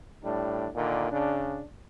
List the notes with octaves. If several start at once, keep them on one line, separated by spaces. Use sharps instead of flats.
A2 G3 D4
A#2 D3 D#3
C#3 D4